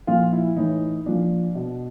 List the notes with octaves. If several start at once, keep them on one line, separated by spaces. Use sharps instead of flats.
A#2 F3 F4
E4
A2 E3 D#4
A#2 F3 D4
B2